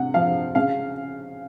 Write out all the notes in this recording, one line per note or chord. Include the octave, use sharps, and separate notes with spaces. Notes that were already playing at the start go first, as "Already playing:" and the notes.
Already playing: C3 F#5
F3 F5
C#3 F5